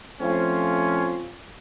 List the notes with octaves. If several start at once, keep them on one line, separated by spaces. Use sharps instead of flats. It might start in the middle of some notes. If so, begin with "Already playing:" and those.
F3 A3 C4 C#4 F4